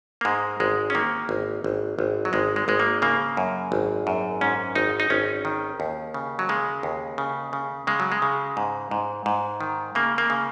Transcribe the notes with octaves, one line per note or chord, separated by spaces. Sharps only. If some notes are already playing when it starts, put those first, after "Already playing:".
A#3
G#2 G#3
G#1 G#3
C#4
D#3 A#3
G#1
G#1
G#1
F#3
G#1 G#3
G#3
G#1 G#3
A#3
C#3 A#3
F#2
G#1
F#2
G#2 C#4
G#1 D#4
D#4
G#1 C#4
D#3
D#2
C#3
F#3
C#3 G#3
D#2
C#3
C#3
C#3 G#3
F#3
G#3
C#3
G#2
G#2
G#2
D#3
C#3 A#3
A#3
C#3